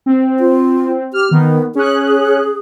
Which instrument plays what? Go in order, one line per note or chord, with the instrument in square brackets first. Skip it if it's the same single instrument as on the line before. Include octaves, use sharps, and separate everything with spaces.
[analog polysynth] C4
[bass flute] F4
[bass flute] G4 [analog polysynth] F6
[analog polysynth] D#3 [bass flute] B3
[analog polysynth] C#4 F#6 [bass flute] G#4